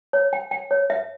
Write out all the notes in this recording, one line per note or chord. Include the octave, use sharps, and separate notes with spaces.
C#5
G5
G5
C#5
E5